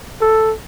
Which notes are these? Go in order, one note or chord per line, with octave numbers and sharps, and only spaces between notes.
A4